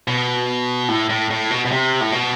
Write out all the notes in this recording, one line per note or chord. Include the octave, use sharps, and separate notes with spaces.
B2
A2
A2
A2
B2
B2
C3
A2
B2